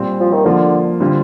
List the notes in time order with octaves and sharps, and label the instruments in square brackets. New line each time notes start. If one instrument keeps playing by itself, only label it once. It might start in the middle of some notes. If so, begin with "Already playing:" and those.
Already playing: [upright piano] A#2 G3 C4
[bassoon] F3
D#3
[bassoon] D3 [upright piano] F3 A#3 F4
[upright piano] D3 G3 C4 F4